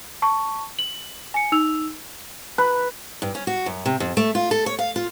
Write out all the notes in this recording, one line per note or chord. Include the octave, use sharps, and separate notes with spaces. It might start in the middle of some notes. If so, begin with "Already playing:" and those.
A5 C#6
F#7
G#5 C#7
D#4 E6 F7
B4
G2
C#4
F#4
F#2
C3
F2
A3
F4
A4
C#5
F5
F4